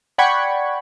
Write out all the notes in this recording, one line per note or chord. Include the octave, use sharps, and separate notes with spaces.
D5 F#5 G5 B5 C#6 G#6